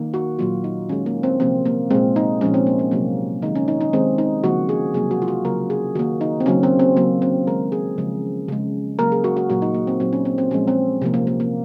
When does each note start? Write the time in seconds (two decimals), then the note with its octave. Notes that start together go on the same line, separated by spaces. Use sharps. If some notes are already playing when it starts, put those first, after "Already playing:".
Already playing: D#3 A#3
0.14 F#4
0.39 A#2 F#3 A#3 F4
0.64 D#4
0.89 D#3 G#3 C#4
1.06 A#3
1.23 C4
1.40 C3 F3 A#3 C4
1.66 A#3
1.90 A#2 G#3 C4
2.16 D#4
2.41 A#2 F3 G#3 C#4
2.54 C4
2.67 A#3
2.79 C#4
2.91 C3 F#3 A#3
3.42 D#3 G#3 D#4
3.55 C#4
3.68 D#4
3.81 D#4
3.93 D#3 G#3 C4
4.18 D#4
4.44 C#3 F3 A#3 F#4
4.69 G#4
4.94 C3 F#3 A#3 G#4
5.11 F#4
5.22 F4
5.28 F#4
5.45 C#3 F#3 A#3 A#4
5.70 G#4
5.95 D#3 A#3 F#4
6.21 D#4
6.40 C4
6.46 C#3 F#3 A#3 C#4
6.63 C4
6.79 C4
6.97 C#3 F#3 A#3
7.22 C4
7.47 D#3 G#3 A#4
7.72 G#4
7.98 C#3 F3 G#3
8.48 C#3 G#3
8.99 C#3 F#3 A#3 A#4
9.12 G#4
9.24 F#4
9.37 F#4
9.50 A#2 F#3 A#3 F#4
9.62 D#4
9.74 A#3
9.87 C4
10.00 A#2 F#3 A#3 C4
10.13 C#4
10.25 C4
10.38 C4
10.51 A#2 F3 G#3 C#4
10.68 C4
11.02 C3 F3 A#3
11.14 A#3
11.27 A#3
11.40 A#3